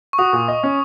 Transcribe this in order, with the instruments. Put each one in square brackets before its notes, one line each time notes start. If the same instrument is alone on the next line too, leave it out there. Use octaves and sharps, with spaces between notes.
[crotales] C#6
[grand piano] F#4 [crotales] D#6
[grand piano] A#2
D#5
C#4